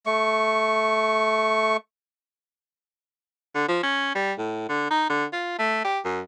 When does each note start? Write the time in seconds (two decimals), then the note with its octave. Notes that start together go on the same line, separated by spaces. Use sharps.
0.06 A3 C#6
3.55 D3
3.68 F3
3.83 C#4
4.15 G3
4.38 A2
4.69 D3
4.90 D#4
5.10 D3
5.33 F4
5.59 A3
5.84 G4
6.05 F#2